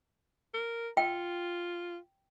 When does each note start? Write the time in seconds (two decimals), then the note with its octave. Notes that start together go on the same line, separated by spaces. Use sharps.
0.54 A#4
0.97 F4 G5